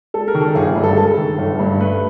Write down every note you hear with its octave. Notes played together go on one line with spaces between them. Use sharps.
G#3 A4
A#4
D#3
A4
G1 G#4
G#4
G2
A4
G#3 A4
D#3
G1
G2
A3 B4